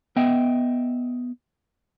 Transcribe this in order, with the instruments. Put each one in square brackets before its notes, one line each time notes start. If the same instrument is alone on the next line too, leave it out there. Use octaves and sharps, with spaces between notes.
[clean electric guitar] B3 D#5 E5 G5